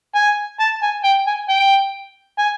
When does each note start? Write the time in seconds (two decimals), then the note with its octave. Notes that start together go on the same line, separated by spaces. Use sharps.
0.15 G#5
0.60 A5
0.82 G#5
1.04 G5
1.27 G#5
1.49 G5
2.38 G#5